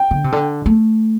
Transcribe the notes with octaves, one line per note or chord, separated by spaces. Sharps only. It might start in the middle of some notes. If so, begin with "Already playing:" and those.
Already playing: G5
D3
C3
D3
A3